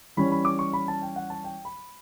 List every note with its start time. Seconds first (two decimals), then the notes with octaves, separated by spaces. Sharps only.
0.17 E3 G3 C#4 B5
0.32 B5
0.45 D6
0.59 C#6
0.73 B5
0.88 A5
1.02 G5
1.16 F#5
1.30 A5
1.44 G5
1.65 B5